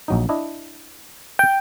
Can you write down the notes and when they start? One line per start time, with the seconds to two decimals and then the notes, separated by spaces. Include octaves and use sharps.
0.08 A#1 F#3 D#4
0.29 D4 E4 D#5
1.39 G5